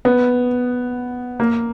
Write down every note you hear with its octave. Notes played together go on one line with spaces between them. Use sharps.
B3
A#3